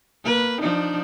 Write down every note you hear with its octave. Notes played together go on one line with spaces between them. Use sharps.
A#3 B4
F3 D4 D#4